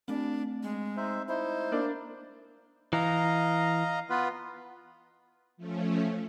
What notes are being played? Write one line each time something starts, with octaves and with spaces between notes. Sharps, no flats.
A3 C4 D4
G#3
D#4 C5 E5
D#4 E4 C5
A#3 D4 D5
E3 D#5 F5 A#5
B3 F4 B4
F3 A3 C#4